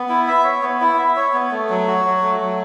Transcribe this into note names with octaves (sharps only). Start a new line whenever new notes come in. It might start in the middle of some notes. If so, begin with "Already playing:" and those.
Already playing: B3
E4
E5
C#5
B3
E4
E5
C#5
B3
A3
F#3
F#4
F#3
A3
F#3